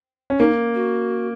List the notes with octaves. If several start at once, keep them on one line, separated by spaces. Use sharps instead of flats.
C#4
A#3 D#4
F#4